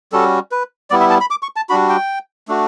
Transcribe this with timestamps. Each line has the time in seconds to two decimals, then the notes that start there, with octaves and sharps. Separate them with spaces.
0.13 G3 C#4 F#4 A4
0.52 B4
0.90 G3 B3 E4 D5
1.00 E5
1.10 A5
1.21 B5
1.30 D6
1.42 C#6
1.56 A5
1.69 G3 D4 F#4 B5
1.89 G5
2.48 A3 D4 F#4